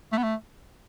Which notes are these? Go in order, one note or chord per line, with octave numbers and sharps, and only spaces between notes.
A3
B3
A3